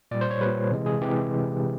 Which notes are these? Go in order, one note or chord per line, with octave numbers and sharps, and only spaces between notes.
A#2 G3 D5
C5
C#5
A#2 G3 B4
C3 E3 G#3
G#4
C3 E3 G#3 G4